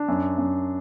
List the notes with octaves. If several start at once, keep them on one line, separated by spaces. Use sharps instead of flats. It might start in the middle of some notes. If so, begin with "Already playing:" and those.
Already playing: D4
F#2
F#2